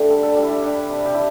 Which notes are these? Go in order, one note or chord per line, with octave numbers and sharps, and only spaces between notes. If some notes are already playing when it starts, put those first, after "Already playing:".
Already playing: D3 A3 D4 G4
G3 A4
A4
G3 G4
E4
G4
G3 D4
C3
G4
G3 E4